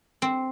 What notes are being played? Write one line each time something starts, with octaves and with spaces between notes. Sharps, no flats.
C4